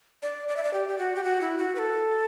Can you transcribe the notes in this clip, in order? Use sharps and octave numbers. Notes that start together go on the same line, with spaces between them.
D5
D5
E5
D5
G4
G4
F#4
G4
F#4
E4
F#4
B4
A4